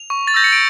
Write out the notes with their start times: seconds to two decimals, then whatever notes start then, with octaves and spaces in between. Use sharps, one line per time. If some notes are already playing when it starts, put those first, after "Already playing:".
Already playing: F7
0.10 C#6
0.27 A6
0.34 E6 G6 A#6
0.44 C#7
0.53 D7